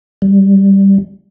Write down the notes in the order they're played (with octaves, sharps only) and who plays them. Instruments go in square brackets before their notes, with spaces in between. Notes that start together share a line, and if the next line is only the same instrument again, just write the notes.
[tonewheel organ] G3